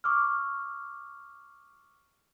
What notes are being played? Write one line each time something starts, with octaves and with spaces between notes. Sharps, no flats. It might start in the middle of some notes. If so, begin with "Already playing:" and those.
C#6 D6 E6 F6